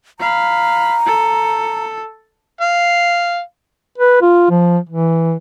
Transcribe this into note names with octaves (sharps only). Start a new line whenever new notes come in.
F5 A#5 B5
A4
F5
B4
F4
F3
E3